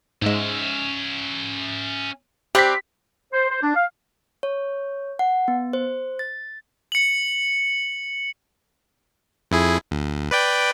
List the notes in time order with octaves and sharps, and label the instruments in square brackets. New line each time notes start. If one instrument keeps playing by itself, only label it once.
[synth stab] G#2 G#3 [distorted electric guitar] C#4 E5
[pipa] G3 C4 [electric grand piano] G4 B6 [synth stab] F#6
[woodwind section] C5
C5
D4
F5
[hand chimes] C#5
F#5
B3
C5
A6
[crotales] C#7 F#7
[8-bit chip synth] F2 E4 G#4
D2
B4 D5 G5